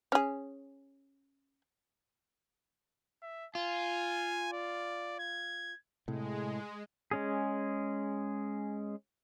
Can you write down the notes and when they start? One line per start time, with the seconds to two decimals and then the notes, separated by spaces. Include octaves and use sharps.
0.12 C#4 G#4
3.22 E5
3.55 F4 G#5
4.53 D5
5.19 G#6
6.08 A2 C3 G#3
7.11 G#3 C#4 G#4